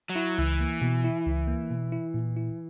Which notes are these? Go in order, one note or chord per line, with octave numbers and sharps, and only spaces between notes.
F#3
E4
C#2 E3
A#3
B2
E4
C#2
A#3
B2
E4
A#2
E4